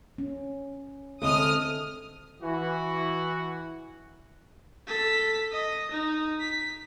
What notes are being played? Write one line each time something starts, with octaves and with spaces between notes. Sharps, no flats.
C#4
A2 D3 G#3 C4 A4 D#5 D#6 F6
E3 F#4
A4 B6
D#5
D#4
B6